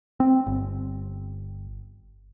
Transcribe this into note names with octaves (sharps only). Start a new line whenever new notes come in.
C4
G1